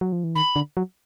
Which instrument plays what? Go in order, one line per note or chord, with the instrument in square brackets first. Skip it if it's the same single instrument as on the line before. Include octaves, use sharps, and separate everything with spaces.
[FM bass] F#3
F3
E3
[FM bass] D#3 [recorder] B5
[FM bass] D3
F#3